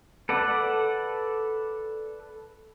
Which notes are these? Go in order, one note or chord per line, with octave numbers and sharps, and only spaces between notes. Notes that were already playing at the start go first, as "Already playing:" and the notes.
A4 B4 D5 F#5